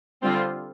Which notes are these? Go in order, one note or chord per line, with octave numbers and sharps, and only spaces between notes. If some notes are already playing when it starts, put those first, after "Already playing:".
D3 G3 C4 F4